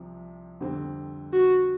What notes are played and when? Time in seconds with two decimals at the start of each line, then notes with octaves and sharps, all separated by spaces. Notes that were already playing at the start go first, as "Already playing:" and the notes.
Already playing: C2 C3 F3
0.60 F2 D3 G3 C4
1.33 F#4